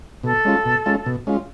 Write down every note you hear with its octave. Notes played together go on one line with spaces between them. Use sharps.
B2 A4
G#3 C#4 F4
B2
G#3 C#4 F4
B2
G#3 C#4 F4